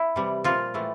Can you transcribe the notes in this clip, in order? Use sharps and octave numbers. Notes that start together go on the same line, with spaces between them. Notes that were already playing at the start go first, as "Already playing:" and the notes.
Already playing: E4
C3 E3 G3
A#2 F3 G3 F4
A2 E3 A3